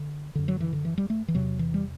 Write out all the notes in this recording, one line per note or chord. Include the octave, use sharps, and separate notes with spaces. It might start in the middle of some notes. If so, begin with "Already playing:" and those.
Already playing: D3
F#2 D3
F#3
E3
D3
E3
G3
A3
E3
E2 C3 F#3
E3
G3